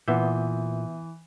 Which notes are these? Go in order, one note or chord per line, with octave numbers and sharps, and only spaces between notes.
A#2 E3 B3 E5 G6